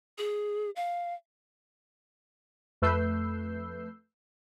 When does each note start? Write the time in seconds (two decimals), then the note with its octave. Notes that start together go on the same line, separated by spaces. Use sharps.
0.18 G#4
0.76 F5
2.82 F2 A3 B4 E6 G6 C7